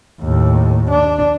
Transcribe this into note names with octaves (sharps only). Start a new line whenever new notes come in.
D#2 A2
D4